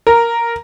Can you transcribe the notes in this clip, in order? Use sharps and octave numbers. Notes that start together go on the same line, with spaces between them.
A#4